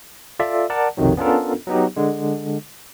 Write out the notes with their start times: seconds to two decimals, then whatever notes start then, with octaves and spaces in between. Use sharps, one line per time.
0.39 F4 A4 D5 E5
0.70 A#4 D5 F#5 A5
0.97 B1 F2 C3 D#3 F#3
1.17 B3 C#4 D4 F4 A4 A#4
1.67 F#3 B3 D#4 G4
1.96 D3 G#3